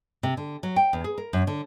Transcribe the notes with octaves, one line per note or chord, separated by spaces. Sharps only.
C3
D3
F#3
G5
E2
G#4
A#4
F#2
D3